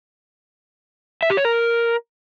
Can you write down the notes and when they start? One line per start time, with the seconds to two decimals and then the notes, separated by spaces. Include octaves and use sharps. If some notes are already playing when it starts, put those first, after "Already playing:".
1.23 E5
1.30 G4
1.37 C#5
1.45 A#4